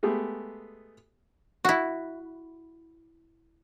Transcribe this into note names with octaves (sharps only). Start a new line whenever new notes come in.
G#3 A3 B3 G4 G#4
E4 F#4